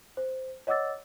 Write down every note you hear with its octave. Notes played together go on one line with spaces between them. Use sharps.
C5
C#5 D#5 F#5 D6 E6 A6